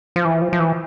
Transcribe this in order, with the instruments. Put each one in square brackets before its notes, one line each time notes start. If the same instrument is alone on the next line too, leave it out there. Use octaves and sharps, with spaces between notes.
[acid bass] F3
E3
F3
F3
E3